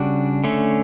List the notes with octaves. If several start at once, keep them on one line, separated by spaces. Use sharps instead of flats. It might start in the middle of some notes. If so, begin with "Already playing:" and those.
Already playing: C#3 G3 D4 F#4
D3 A3 C#4